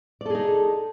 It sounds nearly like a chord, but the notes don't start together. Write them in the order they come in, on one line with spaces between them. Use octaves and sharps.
D5 A4 G#4 D#4